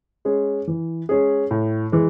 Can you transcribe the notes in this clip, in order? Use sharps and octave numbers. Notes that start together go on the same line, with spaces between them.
G#3 C#4 G#4
E3
G#3 C#4 G#4
A2
E3 G#3